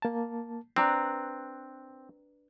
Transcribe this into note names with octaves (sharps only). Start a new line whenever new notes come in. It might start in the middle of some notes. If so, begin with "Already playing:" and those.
A#3 A5
C4 D4 B4 A#5 F#6